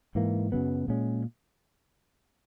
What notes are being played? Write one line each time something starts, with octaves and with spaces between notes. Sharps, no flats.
G#2 E3 A#3
F#2 C#3 F#3 B3
A#2 G#3 C#4